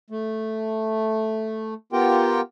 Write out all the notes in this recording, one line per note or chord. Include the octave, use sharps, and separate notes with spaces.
A3
B3 F4 G4 A#4 G5